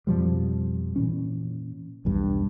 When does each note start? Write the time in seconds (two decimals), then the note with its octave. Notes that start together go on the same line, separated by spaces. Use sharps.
0.07 F2 B2 F3 G3
0.96 A#2 E3 C#4
2.05 B1 E2 G2 G3